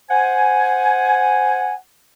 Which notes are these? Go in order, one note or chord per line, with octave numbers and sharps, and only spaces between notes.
C5 F#5 G#5